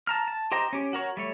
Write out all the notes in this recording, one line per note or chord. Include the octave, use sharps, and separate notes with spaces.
A5 A#5 F6
A5
G4 C5 D#5 G5 A#5
C#4 G4
F#4 A#4 C#5
G3 A3 C#5